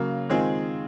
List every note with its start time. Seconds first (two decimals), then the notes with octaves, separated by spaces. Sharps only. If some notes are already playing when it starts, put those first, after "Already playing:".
Already playing: C#3 F#3 A#3
0.29 D#3 G#3 C4 F4 G#4